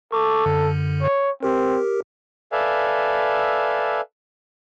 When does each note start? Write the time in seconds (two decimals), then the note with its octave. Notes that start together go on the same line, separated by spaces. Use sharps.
0.12 A4 C#6 D6
0.46 F#2 D3
1.02 C#5
1.43 C4 G4 A#4
2.52 A4 B4 D5 E5 F5 G#5